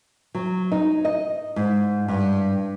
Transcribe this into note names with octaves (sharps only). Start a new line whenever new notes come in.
F#3
D#4
D#5
G#2
G2